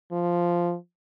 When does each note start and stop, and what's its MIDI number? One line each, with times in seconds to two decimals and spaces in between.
0.12 0.75 53